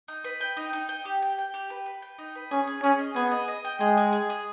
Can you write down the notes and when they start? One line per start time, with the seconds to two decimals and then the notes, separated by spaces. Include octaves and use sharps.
0.08 D#4
0.24 B4
0.41 G5
0.57 D#4
0.73 D#4
0.89 G5
1.05 G4
1.22 G5
1.38 G5
1.54 G4
1.70 B4
1.86 B4
2.02 G5
2.19 D#4
2.35 B4
2.51 C#4 G#4
2.67 G#4
2.83 C#4 G#4
2.99 D#5
3.16 B3 G#4
3.31 D#5
3.48 D#5
3.65 G5
3.80 G#3 G#4
3.97 G#4
4.13 G#4
4.30 G#4